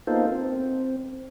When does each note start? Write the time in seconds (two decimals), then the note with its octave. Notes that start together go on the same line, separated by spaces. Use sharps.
0.07 A#3 B3 D#4 F4 A4 C5
0.31 C4